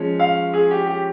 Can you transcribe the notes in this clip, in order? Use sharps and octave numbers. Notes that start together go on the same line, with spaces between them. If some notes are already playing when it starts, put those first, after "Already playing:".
Already playing: F3 G#3 C#4
F5
G#4
G4
G4